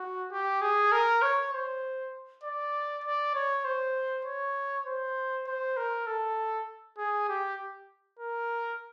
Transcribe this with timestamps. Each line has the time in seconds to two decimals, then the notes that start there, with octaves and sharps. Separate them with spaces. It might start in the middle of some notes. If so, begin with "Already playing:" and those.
Already playing: F#4
0.31 G4
0.61 G#4
0.92 A#4
1.22 C#5
1.53 C5
2.43 D5
3.04 D5
3.34 C#5
3.65 C5
4.25 C#5
4.86 C5
5.46 C5
5.77 A#4
6.07 A4
6.98 G#4
7.28 G4
8.19 A#4